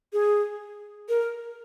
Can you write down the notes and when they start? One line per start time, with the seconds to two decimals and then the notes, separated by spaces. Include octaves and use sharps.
0.13 G#4
1.09 A#4